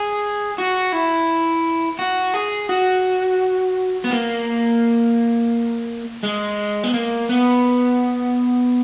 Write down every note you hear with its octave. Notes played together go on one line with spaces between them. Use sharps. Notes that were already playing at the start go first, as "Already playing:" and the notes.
Already playing: G#4
F#4
E4
F#4
G#4
F#4
B3
A#3
G#3
B3
A#3
B3